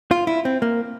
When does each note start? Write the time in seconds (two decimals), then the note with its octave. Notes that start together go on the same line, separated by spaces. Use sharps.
0.11 F4
0.27 E4
0.45 C4
0.62 A#3